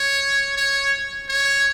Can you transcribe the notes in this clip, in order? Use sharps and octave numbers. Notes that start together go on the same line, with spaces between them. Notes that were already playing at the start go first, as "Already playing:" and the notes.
Already playing: C#5
C#5
C#5